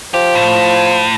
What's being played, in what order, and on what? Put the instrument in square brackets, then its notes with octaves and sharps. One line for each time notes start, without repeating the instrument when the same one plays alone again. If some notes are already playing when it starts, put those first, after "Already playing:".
[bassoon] F3 [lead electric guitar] G4
[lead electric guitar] A2